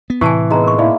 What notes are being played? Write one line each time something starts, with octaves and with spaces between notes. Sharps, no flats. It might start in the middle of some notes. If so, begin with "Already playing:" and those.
B3
A2 C3 E3 G#5 A5 C#6
G#3 B3 D#4 A#5
A#4 C#6
A#3 D#4 E4 G#4 D5